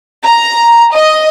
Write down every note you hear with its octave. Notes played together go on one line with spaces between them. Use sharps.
A#5
D#5